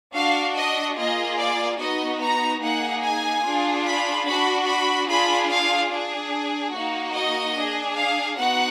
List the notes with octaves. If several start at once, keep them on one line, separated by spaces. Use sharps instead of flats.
D4 F#4 F5
D#5
A#3 F4 G#4 D#5
D5
B3 D#4 F#4 D#5
A#5
A#3 D#4 G#4 F#5
G#5
D4 F4 G#4
B5
D4 F#4 B5
B5
D4 F4 G#4 B5
F5
D4 G#4
A#3 D#4 F#4
D#5
D4 G#4
F5
B3 D#4 F#4 F#5